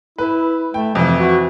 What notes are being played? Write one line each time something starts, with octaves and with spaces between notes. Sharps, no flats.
E4 B4
A3 G5
F2 C3 E3
F#4